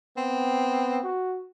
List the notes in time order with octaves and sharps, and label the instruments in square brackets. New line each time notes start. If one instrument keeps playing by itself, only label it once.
[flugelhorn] B3 [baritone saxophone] C4
[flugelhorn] F#4